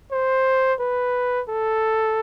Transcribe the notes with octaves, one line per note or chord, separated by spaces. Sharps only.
C5
B4
A4